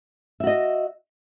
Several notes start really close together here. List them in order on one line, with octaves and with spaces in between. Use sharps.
E5 F#4 D#5